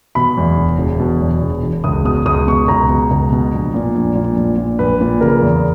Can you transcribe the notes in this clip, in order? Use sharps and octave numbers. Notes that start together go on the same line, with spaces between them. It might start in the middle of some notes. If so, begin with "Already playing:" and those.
B2 B5
E2
E1
E1
B2
E2
E1
E1
C#2 D#6
B2 D#6
C#2 D#6
B2 C#6
C#2 A#5
B2
C#2
B2
A#1
A#2
A#1
A#2
A#1
A#2
A#1 B4
A#2
C#3 A#4
E2